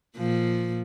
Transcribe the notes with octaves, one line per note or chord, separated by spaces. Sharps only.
A#2 F3